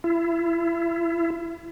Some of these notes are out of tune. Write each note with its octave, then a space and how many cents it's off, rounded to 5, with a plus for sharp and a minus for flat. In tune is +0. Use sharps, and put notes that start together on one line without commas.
E4 +35